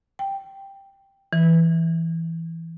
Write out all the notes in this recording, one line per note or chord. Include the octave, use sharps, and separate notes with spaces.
G5
E3